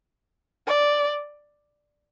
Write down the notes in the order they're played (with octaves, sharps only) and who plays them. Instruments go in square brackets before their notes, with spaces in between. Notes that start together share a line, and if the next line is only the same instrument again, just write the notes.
[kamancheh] D5